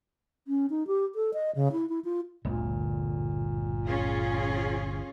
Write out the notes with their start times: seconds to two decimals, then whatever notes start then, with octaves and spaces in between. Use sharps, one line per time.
0.48 C#4
0.70 D#4
0.87 G4
1.15 A4
1.34 D#5
1.55 C#3
1.72 E4
1.89 E4
2.05 F4
2.45 G1 D2 A#2
3.86 C#4 F4 G#4